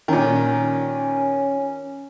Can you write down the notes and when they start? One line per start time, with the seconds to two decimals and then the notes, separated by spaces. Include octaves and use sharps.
0.08 A#2 D#3 C#4